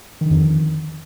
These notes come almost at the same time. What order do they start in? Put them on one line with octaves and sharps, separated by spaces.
D#3 D3 F2